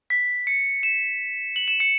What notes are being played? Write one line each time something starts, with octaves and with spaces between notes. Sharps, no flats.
B6
C#7
E7
F#7
E7
C#7